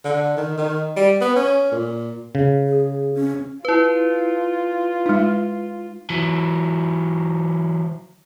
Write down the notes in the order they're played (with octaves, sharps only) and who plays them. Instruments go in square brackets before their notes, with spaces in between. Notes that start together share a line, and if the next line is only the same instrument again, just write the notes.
[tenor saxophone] D3
D#3
D#3
G3
B3
C#4
A#2
[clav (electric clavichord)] C#3
[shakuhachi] G#4
C#4
[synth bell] E4 B4 [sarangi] F4
[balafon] G#3 D#4
[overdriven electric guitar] E3 F#3